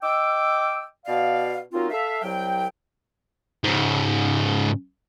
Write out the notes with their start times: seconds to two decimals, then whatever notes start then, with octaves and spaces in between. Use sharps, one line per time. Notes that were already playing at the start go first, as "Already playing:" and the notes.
0.02 D#5 G5 D6 E6
1.06 B2 D5 F5
1.73 F#3 A#3 C4 D#4 F4
1.90 A4 E5 F5
2.22 C2 F#3 G5
3.64 G#2 C#3